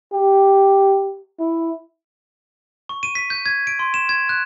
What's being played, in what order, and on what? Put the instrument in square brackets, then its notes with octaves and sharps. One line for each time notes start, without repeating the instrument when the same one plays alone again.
[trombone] G4
E4
[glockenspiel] C#6
D#7
B6
G6
G#6
D7
C6
E7
G#6
F#6